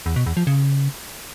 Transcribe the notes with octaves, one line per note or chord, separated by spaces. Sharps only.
E2
B2
E2
F3
C#3